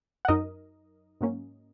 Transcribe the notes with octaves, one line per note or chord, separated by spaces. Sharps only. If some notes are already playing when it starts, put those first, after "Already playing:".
F#5
F#2 F#3 D#4 A#4 D#5
G#2 F#3 A#3 C#4